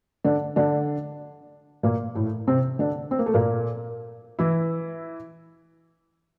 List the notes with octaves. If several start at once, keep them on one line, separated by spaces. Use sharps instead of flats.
D3 D4
D3 D4
A#2 A#3
A2 A3
C3 C4
D3 D4
C4
A#3
A3
A#2 A#3
E3 E4